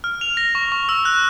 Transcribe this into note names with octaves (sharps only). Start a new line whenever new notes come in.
F6
F7
A#6
C#6
C#6
E6
F#6